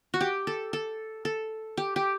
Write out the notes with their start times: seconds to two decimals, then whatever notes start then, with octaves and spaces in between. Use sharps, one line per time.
0.14 F#4
0.21 G4
0.47 A4
0.73 A4
1.25 A4
1.77 G4
1.96 G4